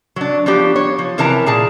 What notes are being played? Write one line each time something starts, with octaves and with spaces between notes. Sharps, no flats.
F#3 D4
F3 F#3 B3 D4 G4
C#5
F3
C3 E3 A#4 E5 A5 A#5
A#2 G#4 A5